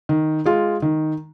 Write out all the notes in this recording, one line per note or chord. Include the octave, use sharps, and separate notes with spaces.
D#3
G#3 F4
D#3